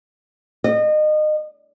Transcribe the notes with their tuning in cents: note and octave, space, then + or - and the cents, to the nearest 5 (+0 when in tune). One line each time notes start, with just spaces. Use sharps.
D#5 -30